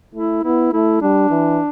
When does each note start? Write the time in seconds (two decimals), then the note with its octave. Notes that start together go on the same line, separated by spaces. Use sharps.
0.15 A3 E4
0.44 B3 E4
0.73 A3 E4
1.01 G3 D4
1.30 E3